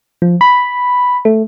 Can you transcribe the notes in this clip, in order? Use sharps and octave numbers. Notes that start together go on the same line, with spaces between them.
F3
B5
A3